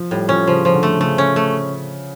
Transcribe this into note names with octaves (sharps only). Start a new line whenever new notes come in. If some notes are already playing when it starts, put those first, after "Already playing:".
Already playing: F3
A2 G3
F3 C#4
C#3 F3
F3
D3
A3
C#3 A3
C#4
A3